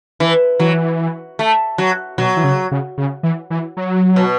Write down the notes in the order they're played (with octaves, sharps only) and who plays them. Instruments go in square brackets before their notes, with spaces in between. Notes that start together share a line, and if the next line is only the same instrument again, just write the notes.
[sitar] E3
[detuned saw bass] E3 [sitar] F#3
[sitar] A3
F#3
[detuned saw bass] B2 [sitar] F#3
[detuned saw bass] E3
C#3
C#3
C#3
E3
E3
F#3
[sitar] B2